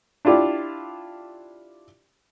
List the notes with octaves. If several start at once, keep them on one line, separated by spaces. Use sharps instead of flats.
D4 E4 F4 G4 D5